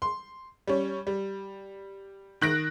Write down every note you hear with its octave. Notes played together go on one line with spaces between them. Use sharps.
C6
G3 C#4
G3
D#3 F#6 A#6 D7